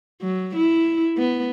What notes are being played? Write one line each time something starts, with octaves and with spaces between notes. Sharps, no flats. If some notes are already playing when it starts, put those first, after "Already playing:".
F#3
E4
B3